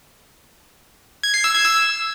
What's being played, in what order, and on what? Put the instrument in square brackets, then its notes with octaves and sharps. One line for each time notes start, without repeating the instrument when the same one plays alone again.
[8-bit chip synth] G#6
C7
E6
G#6
E6